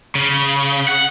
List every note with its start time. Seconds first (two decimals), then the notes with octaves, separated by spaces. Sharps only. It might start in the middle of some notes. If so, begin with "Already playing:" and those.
0.15 C#3
0.88 F#5